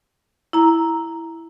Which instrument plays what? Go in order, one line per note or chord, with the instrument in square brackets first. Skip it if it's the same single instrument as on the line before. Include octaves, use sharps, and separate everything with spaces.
[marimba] E4 A#5